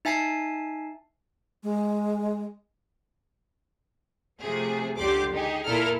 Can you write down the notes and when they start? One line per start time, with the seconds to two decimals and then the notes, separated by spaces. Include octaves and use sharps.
0.05 D#4 E5 G#5 A5 C7
1.63 G#3
4.40 C3 F3 A3 G#4
4.98 C#2 D3 G4 D5 C6 D6
5.32 D#4 G4 G#4
5.65 A#2 E4 A4 A#4 F6